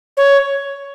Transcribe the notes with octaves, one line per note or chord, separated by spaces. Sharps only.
C#5